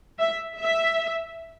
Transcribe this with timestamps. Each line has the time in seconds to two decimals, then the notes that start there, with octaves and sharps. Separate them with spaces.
0.20 E5
0.60 E5